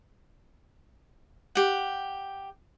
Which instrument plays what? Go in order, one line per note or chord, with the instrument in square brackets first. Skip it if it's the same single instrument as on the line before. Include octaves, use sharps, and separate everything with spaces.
[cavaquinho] G4 F#5